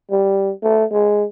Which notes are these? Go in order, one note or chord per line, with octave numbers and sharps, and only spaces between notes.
G3
A3
G#3